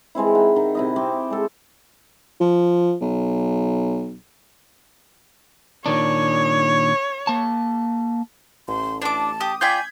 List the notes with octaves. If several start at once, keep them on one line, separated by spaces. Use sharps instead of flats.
E3 G#3 C4 E4
D#4 F#4 F#5 B5
D#3 D#4
C3 E4 D#5
C4 G5 C#6 D6
G#3 A4
F3
B1
A#2 D#3 D4 C#5
A#3 A5
A1 C6
D4 A5 D6
G4 D#6
F4 D5 G5 G#5 G6 G#6 B6